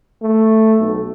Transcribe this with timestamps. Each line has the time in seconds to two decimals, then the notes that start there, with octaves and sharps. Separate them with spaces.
0.22 A3
0.80 B1